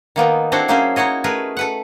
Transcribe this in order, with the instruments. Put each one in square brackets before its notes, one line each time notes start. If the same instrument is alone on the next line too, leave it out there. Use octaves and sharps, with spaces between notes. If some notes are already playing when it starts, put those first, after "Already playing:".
[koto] D#3 A#3 B3 D#4
C4 D4 E4 F#4 A4 C5
F#3 A#3 C#4 G#4 C5 E5
D#4 E4 F#4 C#5 D#5
A3 G#4 A#4 B4
A4 B4 F#5